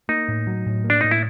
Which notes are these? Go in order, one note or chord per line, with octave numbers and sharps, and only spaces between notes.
A#3 D#4
A2
F#3
A2
A#3
D4
A2 D#4
E4